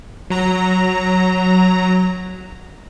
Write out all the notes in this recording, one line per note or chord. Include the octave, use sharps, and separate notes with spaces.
F#3 A#5